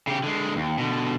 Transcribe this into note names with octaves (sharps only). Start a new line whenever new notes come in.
C#3 G4
D3 G#3
D#2
B2 D3